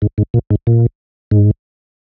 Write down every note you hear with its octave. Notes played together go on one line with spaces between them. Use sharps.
G#2
G#2
A#2
G#2
A#2
G#2